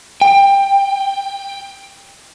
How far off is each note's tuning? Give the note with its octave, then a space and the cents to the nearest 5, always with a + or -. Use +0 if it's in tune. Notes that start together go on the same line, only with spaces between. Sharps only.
G5 +15